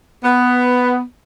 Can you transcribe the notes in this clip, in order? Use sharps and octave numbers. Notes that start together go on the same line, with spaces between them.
B3